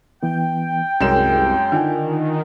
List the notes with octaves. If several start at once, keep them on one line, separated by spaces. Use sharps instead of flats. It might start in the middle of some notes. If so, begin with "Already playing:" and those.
E3 B3 G5
C2 F#2 G#3 C#4 G#4 A#4 E7
D3 D#3 F4 G#5